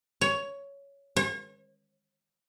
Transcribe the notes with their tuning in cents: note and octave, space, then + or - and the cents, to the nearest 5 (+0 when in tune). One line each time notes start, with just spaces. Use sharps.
C#5 +10
C#5 -40